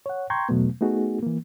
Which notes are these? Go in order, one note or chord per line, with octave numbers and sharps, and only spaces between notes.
C#5 F#5
G5 A#5 C6 C#6 G6 G#6
E2 B2 F#3 A3 B3
A3 B3 D#4 F#4 G#4
E3 A#3